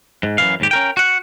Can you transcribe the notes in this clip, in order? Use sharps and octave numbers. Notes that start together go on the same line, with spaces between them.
G#2
F#2 C3 E3 F5
D#2 G#2 G4
C#4 A#4 G5
F#4 F#5